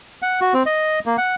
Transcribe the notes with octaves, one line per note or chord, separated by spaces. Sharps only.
F#5
F#4
C4
D#5
A#3
F#5